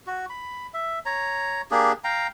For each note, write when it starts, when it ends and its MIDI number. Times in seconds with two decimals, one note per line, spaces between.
0.07 0.26 66
0.30 0.67 83
0.74 0.99 76
1.06 1.61 73
1.06 1.61 82
1.71 1.92 58
1.71 1.92 62
1.71 1.92 67
1.71 1.92 68
2.04 2.27 77
2.04 2.27 79
2.04 2.27 82